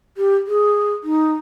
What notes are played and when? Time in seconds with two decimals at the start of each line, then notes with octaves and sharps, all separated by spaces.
0.17 G4
0.47 G#4
1.04 D#4